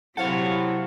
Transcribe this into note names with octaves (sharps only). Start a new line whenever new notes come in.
C3 F#3 E4 A4 C5 C#5 F5 F#5